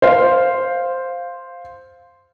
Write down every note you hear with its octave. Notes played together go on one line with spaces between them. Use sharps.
C5 F5